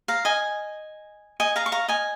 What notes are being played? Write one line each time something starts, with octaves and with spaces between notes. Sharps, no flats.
F5 A#5
D#5 G#5
D#5 G#5
F5 A#5
C#6
F5 A#5
D#5 G#5